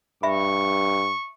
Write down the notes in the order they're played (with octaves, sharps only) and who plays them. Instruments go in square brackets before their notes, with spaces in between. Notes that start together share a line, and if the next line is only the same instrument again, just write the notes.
[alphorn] G2 [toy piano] E5 B5 [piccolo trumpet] C#6